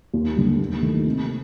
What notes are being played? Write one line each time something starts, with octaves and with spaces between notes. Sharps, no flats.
D#2
D3 G3
D#2
D#3 A3
C3